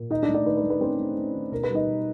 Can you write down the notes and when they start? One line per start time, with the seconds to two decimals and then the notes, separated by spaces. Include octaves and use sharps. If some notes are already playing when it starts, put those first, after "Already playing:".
Already playing: A#2
0.10 D#3 D#4 D#5
0.23 D4 D5
0.29 A3
0.34 D4 D5
0.46 D#3 B4
0.57 B4
0.64 A3
0.70 B4
0.81 C4 C#4 C5
0.99 A3
1.16 C#4
1.34 D#3
1.52 B2 A#4
1.64 B4
1.69 G3
1.75 D#4 D#5
1.87 B2